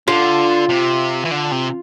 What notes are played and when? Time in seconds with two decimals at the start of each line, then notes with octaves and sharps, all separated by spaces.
0.08 D3 F4
0.69 C3
1.25 E3
1.31 D3
1.52 C3